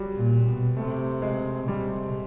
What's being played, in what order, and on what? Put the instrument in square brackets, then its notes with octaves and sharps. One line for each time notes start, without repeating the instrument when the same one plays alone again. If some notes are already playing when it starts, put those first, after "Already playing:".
Already playing: [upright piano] F#3 G3
[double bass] A#2
B2
[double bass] C3 [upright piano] A3
[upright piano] G#3
[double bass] C3 [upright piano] G3